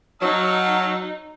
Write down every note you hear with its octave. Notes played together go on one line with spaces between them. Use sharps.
F#3 D#4 F5 A5 E6